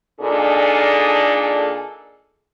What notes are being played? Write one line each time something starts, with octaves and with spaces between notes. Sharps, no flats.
A#2 D4 D#4 G#4 A4